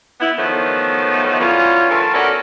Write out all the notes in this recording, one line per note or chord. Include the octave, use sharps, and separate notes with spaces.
B3 E4
D#3 F3 F#3 A3 B3
E3 F#3 G3 C#4 F4
D3 E3 A3 F4 A4 A#4
B3 C#4 F#4 A4 A#4 D5